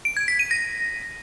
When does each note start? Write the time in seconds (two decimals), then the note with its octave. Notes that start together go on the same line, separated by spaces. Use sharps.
0.05 D7
0.17 G#6
0.28 B6
0.39 D#7
0.51 A#6